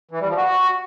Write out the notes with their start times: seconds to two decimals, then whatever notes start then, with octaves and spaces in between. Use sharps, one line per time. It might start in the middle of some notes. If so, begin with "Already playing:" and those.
0.11 E3
0.20 G3
0.28 F3
0.37 F#4